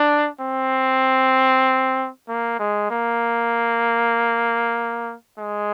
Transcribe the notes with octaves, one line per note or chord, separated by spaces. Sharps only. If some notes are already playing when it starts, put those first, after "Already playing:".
Already playing: D4
C4
A#3
G#3
A#3
G#3